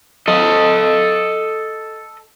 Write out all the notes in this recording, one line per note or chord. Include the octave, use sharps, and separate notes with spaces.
A4 D#5